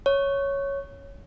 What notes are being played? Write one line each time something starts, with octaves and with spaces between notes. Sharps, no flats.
C#5